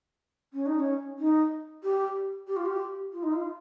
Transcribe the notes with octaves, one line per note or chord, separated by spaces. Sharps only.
C#4
D#4
C#4
D#4
G4
G4
F4
G4
F4
D#4
F4